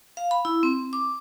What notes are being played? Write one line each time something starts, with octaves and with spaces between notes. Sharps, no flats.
F5
B5
E4
C4
D6